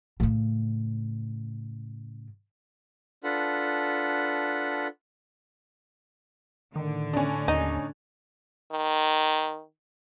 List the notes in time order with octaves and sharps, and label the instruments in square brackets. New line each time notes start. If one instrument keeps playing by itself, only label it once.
[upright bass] A2 C#3
[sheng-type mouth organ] D4 F4 A4 B4 F#5
[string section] A2 D3 [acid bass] D#3
[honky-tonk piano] C#4 D4
[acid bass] D#2 [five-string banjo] D#4
[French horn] D#3